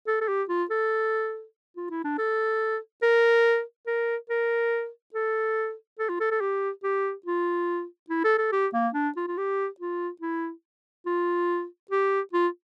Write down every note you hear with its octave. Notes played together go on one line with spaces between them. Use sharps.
A4
A4
G4
F4
A4
F4
E4
D4
A4
A#4
A#4
A#4
A4
A4
F4
A4
A4
G4
G4
F4
E4
A4
A4
G4
A#3
D4
F4
F4
G4
F4
E4
F4
G4
F4